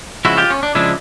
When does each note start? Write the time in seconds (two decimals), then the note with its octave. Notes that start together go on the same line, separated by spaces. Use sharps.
0.25 C#3 F3 G#3 E4 F#4
0.37 F4 G4
0.50 C#4
0.63 D4
0.75 C#3 F3 G#3 D4 E4